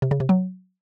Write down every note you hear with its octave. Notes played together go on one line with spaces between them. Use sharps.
C3
C#3
C3
F#3